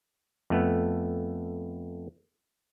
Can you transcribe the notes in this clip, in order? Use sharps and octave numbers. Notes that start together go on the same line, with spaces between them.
F2 A3 B3